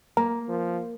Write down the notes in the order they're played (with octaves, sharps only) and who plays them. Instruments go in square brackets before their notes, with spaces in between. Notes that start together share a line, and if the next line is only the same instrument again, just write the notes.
[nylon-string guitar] A#3 [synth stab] A#4
[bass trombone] F3